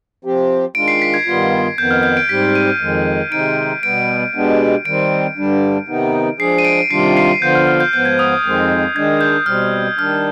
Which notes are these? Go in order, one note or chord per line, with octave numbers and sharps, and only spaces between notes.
F3 C4 G4
D#3 G#3 D4 F4 D7
C7
B6
G#6
G2 D#3 G3 B3 F4
F2 D#3 B3 G6
F6
G6
D7
G#2 G3 C4 G4 B6
D#7
F2 D#3 G#3
C3 D#3 G#3 C4 D#4 D7
B2 G3 B3 D7
B2 G#3 B3 D4 G4
D#3 G3 C4 D7
G2 D3 G3 D4
C3 D#3 B3 D#4
F3 G#3 D4 G#4 C7
D#7
D7
C3 D#3 G3 D4 F4 C7
C7
D3 F3 B3 F4 G6
F6
F6
G6
G#2 F3 B3 G6
G#6
D#6
F2 D#3 G#3 C4
D#3 G#3 D4 G#6
G6
B2 G3 C4 F6
D#3 G3 D4 F6